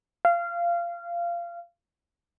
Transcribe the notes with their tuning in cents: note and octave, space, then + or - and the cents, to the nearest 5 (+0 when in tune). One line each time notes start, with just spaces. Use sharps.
F5 -20